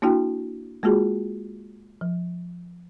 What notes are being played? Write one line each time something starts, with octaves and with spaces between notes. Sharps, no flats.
A#3 D4 E4 F#4 G5
G#3 A#3 F4 F#4 G#4
F3